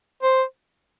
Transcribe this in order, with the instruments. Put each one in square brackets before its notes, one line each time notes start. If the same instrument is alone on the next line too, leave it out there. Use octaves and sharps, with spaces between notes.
[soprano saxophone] C5